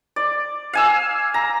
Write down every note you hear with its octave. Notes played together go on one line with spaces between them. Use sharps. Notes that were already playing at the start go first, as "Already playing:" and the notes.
D5
F5 G#5 E6
A#5